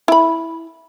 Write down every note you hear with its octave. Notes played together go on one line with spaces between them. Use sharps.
E4 B5